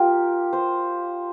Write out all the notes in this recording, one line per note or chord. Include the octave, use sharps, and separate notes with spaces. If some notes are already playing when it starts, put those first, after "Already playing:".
Already playing: F4 G4 A#4
C5